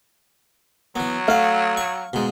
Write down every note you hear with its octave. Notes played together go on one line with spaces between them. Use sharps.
E3 F#3 B3
A3 F5 F#5
C#6
G#2 B2 G#3